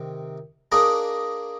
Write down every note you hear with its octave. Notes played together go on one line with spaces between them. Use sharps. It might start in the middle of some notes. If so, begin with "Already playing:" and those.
Already playing: C3 D#3
A#3 D4 G#4 D#5